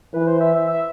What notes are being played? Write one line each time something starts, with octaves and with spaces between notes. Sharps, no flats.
E3 B4
C5
E5
E5
E5